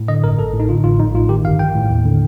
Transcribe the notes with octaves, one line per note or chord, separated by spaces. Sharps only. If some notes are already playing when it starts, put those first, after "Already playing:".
Already playing: A2
D3 D#5
G1 A#4
A1 A4
A2
D#4
D3 F4
A1 F4
A#1 D#4
A2 F4
D#3 G4
G1 F5
A#1 G5
A2
D#2
D3